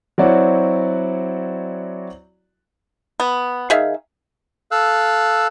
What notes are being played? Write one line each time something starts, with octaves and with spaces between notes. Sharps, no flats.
F#3 C4 E4 F#4 C#5 D5
B3
D#3 G#4 E5 F5
A4 F5 E6 F#6